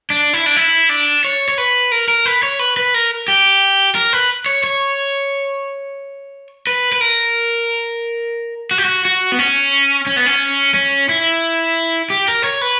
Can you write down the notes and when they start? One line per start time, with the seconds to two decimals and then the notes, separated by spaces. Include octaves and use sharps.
0.10 D4
0.34 E4
0.46 D4
0.57 E4
0.89 D4
1.25 C#5
1.48 C#5
1.58 B4
1.92 A#4
2.08 A#4
2.26 B4
2.43 C#5
2.59 B4
2.77 B4
2.94 A#4
3.28 G4
3.95 A#4
4.13 B4
4.46 C#5
4.64 C#5
6.67 B4
6.92 B4
7.01 A#4
8.71 F#4
8.78 G4
8.85 F#4
9.05 F#4
9.32 B3
9.39 C#4
10.06 C#4
10.16 B3
10.26 C#4
10.74 C#4
11.09 E4
12.10 G4
12.28 A#4
12.44 C#5
12.61 B4